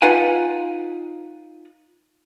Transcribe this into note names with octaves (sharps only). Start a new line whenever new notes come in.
D#4 F4 B4 F5 F#5 G#5